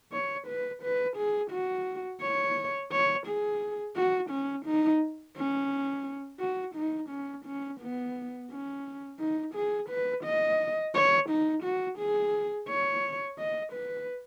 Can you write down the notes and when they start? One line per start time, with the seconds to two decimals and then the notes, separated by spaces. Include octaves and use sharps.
0.13 C#5
0.47 B4
0.83 B4
1.17 G#4
1.51 F#4
2.21 C#5
2.92 C#5
3.27 G#4
3.96 F#4
4.31 C#4
4.66 D#4
5.37 C#4
6.40 F#4
6.75 D#4
7.10 C#4
7.46 C#4
7.81 B3
8.51 C#4
9.20 D#4
9.55 G#4
9.90 B4
10.25 D#5
10.95 C#5
11.30 D#4
11.64 F#4
11.99 G#4
12.69 C#5
13.39 D#5
13.73 B4